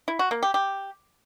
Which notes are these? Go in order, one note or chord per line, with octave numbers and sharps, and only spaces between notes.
E4
F#4
A#3
G4
G4